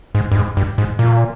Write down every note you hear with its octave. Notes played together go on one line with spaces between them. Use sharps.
G#2
G2
G#2
G2
G#2
A#2